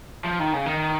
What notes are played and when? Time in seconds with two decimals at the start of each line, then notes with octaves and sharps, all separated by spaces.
0.24 F3
0.39 D#3
0.53 C#3
0.65 D#3